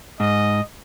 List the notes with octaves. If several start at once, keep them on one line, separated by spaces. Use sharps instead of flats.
G#2 D#5